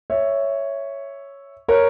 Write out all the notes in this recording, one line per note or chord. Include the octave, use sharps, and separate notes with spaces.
C#5 E5
A#4 C#5